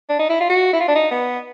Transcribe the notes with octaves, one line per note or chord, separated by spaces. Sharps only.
D4
D#4
E4
F4
F#4
E4
F4
D4
D#4
B3